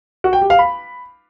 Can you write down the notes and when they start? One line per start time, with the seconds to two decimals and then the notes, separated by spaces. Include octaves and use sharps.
0.24 F#4
0.33 G5
0.41 G4
0.50 F5
0.59 B5